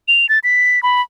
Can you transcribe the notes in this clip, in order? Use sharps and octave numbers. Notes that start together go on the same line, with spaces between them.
F7
A6
B6
B5